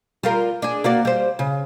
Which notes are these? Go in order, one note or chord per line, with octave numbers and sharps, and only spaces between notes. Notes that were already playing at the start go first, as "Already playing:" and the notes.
G3 F4 A#4
D4 G#4
A#3 F#4 D5
G3 C5
C#3